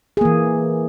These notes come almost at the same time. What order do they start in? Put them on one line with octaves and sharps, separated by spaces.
G#4 A#3 E3